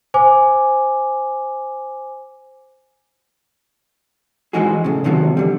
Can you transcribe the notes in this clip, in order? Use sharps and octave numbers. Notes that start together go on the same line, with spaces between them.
C5 G#5 D6
E3 F3 G#3 D#4 F#4 G#4
A2 C#3
E2 C3 D#3 F3 F#3
E2 D3 G3